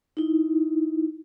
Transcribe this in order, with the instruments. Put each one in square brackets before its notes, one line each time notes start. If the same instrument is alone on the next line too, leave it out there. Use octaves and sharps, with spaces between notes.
[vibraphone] D#4 E4